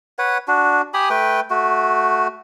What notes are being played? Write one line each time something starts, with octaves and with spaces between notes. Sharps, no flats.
B4 C#5 F#5
D4 F#4
G4 G#5 B5 D#6
A3 B4 G5
A3 F#4